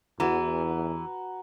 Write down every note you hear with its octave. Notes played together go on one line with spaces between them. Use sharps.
E2 E3 F#4 A#5